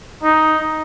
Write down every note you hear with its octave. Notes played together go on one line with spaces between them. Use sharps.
D#4